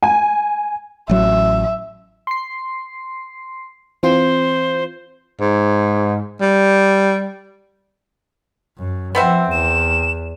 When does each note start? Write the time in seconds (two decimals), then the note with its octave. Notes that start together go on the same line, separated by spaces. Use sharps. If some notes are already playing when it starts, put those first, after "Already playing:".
0.03 G#5
1.09 A1 F#3 E5
2.27 C6 C7
4.03 E3 C4 F4 C5
5.40 G#2
6.41 G3
8.77 F#2
9.15 F3 B3 C4 E5
9.51 E2 E7